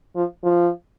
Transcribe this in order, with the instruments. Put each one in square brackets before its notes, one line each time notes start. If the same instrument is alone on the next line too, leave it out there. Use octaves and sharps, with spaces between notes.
[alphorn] F3
F3